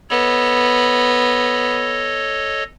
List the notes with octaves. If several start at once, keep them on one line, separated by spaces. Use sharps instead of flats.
B3 A4 C#5 D#5